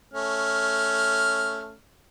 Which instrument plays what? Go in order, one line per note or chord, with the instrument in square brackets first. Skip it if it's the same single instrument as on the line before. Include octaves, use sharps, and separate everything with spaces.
[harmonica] A3 C#4 F6